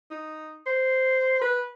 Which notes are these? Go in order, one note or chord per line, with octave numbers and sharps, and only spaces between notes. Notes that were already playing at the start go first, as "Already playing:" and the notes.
D#4
C5
B4